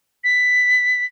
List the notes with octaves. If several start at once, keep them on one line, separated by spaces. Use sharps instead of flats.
B6